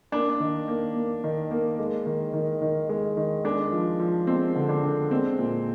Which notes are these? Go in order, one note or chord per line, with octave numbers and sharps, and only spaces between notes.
A#3 D4
D#3
A#3
A#3
D#3
A#3
G#3
D#3
D#3
D#3
G#3
D#3
G#3 D4
F3
F3
G#3 C4
D3
D4
D3
G#3 C4
A#2